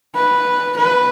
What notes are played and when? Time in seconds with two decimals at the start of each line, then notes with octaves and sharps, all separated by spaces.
0.15 B4
0.77 B4